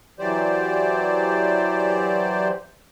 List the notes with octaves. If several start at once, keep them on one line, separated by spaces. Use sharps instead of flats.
E3 F#3 G4 C5 D5